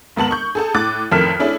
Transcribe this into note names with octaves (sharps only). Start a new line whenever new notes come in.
D#2 G#2 B3 A5 F#7
C#6 G6
G#4 A4 A5
A2 D6 F#6 A6
A1 F2 D#3 A4 F6 B6
A3 C#4 D4 E4 G#4